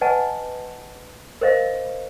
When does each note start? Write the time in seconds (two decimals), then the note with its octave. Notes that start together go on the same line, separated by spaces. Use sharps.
0.01 B4 D#5 F#5 G#5 A5
1.41 A#4 C5 D#5 F5